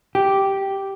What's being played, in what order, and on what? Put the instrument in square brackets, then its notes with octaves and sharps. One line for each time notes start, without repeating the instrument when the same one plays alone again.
[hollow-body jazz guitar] G4